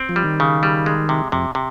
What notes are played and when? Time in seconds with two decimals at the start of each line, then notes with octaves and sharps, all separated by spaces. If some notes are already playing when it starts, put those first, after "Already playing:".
Already playing: C4
0.09 F3
0.16 G3
0.24 D#3
0.40 C#3
0.63 G3
0.86 G#3
1.09 C3
1.32 F2 C3
1.55 C3